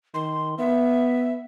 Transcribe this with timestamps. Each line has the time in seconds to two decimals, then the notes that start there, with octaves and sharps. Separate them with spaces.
0.14 D#3 C6
0.58 B3 E5